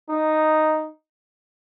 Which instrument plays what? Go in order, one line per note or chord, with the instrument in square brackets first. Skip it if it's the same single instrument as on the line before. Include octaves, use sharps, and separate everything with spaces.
[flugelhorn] D#4